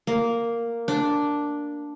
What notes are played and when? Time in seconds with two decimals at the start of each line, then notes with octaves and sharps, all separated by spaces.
0.07 A#3
0.88 D4